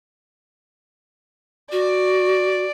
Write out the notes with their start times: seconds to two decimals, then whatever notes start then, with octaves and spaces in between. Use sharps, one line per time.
1.72 F#4 D5